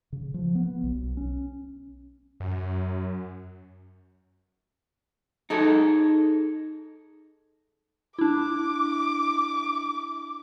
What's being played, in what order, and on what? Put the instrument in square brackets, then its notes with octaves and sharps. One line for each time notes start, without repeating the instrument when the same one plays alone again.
[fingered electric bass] C#3
F3
B3
B1
C#4
[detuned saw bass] F#2
[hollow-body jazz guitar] D#4 G#4 A4
[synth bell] D4 E4 [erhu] D6